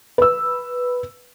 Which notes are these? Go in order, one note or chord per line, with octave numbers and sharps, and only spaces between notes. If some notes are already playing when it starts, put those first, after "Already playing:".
B4 E6